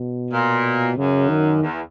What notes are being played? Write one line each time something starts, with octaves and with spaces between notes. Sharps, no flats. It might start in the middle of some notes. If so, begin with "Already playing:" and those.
Already playing: B2
A#2
F#2 C#3
D#3
E2